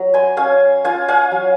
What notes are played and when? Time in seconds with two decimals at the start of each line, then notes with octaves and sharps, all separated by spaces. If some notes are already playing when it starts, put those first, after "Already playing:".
Already playing: F#3 A#5
0.14 G#5 C6
0.37 C#4 F5 G#5
0.84 F4 F5 G#5
1.08 F5 G#5
1.32 F#3